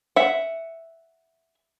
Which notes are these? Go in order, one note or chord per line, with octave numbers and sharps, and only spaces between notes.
E5 F#5